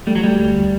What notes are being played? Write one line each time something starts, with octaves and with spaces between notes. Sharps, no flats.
G3 A3
F#3
G3
D2